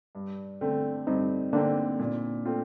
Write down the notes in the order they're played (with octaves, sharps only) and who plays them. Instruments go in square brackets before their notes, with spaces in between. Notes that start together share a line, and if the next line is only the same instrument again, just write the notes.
[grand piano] G2
D3 A3 C4
[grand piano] G2 [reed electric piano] C4 D#4
[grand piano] D3 A3 C4 [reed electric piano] A#3 D4
[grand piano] A#2
A3 C4 F4